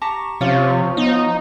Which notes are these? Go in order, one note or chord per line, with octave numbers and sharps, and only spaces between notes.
G4 A5 A#5 C#6
C3 F3 C#4 F4 C#5
B3 D#4